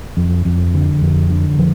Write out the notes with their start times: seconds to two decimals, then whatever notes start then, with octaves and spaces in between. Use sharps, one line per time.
0.17 F2
0.45 F2
0.74 D3
1.01 F2
1.30 D3
1.59 F3